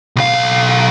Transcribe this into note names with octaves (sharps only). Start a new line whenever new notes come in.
B1 F5